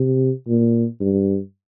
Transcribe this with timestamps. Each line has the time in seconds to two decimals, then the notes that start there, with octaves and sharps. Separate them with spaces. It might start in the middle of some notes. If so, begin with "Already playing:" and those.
Already playing: C3
0.48 A#2
1.01 G2